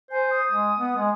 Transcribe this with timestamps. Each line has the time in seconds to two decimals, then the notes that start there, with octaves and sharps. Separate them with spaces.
0.11 C5 G#5
0.31 D#6
0.52 G#3
0.78 B3
0.97 G#3